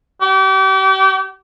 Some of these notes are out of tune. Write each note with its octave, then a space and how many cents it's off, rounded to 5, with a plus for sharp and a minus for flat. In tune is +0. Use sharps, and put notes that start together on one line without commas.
G4 -40